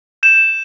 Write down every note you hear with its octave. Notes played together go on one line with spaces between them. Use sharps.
G6 E7